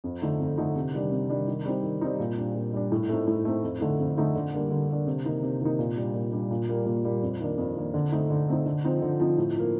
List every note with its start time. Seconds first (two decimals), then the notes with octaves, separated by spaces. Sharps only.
0.04 F2
0.22 D3 A3 D#4
0.40 F2
0.58 D3 A3 D#4
0.76 C3
0.94 D#3 G3 D4
1.12 C3
1.29 D#3 G3 D4
1.48 D#3
1.65 G3 C4 D#4
1.84 D#3
2.01 G3 C4 D#4
2.20 A#2
2.38 G3 D4
2.55 A#2
2.73 G3 D4
2.92 A2
3.09 A3 C4 D#4
3.27 A2
3.45 A3 C4 D#4
3.64 F2
3.81 D3 A3 D#4
4.00 F2
4.17 D3 A3 D#4
4.35 D3
4.53 G3 A#3 D4
4.71 D3
4.89 G3 A#3 D4
5.07 C3
5.25 D#3 A#3 D#4
5.43 C3
5.61 D#3 A#3 D#4
5.79 A#2
5.97 G3 D4
6.14 A#2
6.33 G3 D4
6.51 A#2
6.69 G3 A#3
6.86 A#2
7.05 G3 A#3
7.23 F2
7.40 D#3 A#3 D4
7.58 F2
7.77 D#3 A#3 D4
7.94 D3
8.12 A3 C4 D#4
8.30 D3
8.48 A3 C4 D#4
8.66 D3
8.85 F3 C4 D#4
9.02 D3
9.20 F3 C4 D#4
9.38 A2
9.56 F3 A#3